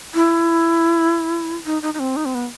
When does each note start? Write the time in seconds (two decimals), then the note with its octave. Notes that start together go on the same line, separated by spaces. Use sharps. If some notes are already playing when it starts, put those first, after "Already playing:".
0.15 E4
1.66 D#4
1.82 D#4
1.94 D#4
1.99 C4
2.16 D#4
2.25 C4
2.35 B3